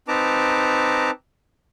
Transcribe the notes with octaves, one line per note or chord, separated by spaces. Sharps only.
C4 D#4 B4 A5 A#5 D6